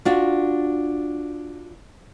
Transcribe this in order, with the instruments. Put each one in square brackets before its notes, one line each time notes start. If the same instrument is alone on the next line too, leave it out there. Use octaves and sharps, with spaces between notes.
[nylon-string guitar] D4 F4 F#4